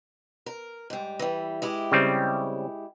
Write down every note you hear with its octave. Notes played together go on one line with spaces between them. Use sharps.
A#4
G#2 G3
E3 G3
G#3 E4 G4
C#3 G3 C4